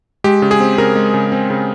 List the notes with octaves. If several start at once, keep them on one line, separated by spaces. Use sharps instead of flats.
G#3 G4
C#3
G#4
C4
C#3 A#4
G#3
C#3
C4
C#3